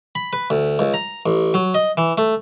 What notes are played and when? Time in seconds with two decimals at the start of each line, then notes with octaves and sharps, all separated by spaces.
0.15 B5
0.33 B4
0.50 D2
0.79 C#2
0.94 A#5
1.26 A1
1.54 F#3
1.74 D#5
1.97 E3
2.18 A3